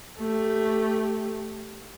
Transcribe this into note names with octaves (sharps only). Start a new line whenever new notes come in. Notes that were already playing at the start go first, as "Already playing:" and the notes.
A3 G4